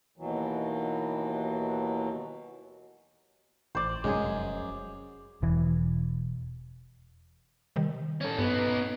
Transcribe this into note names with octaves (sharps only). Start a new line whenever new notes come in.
D#2 B2 E3 F#3
A1 C5 D5
F1 F#2 G#3 G#4
E1 E3
C3 D#3 G3
C#4 A4
G2 B3 D#4